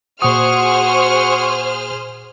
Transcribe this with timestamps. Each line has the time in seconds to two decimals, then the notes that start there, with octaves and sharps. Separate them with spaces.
0.22 A#2 F#4 G#4 C5 F#5 C#6 D#6 F6